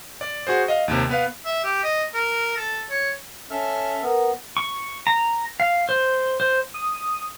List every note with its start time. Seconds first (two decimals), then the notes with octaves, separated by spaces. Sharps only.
0.21 D5
0.47 F#4 G#4 C5
0.68 D#5 F5
0.88 D#2 C3
1.09 B3 B4 F5
1.45 E5
1.64 G4
1.83 D#5
2.14 A#4
2.57 A4
2.90 C#5
3.51 C#4 A4 E5 F6
4.02 B3 A#4
4.57 C#6
5.07 A#5
5.60 F5
5.89 C5
6.40 C5
6.74 D#6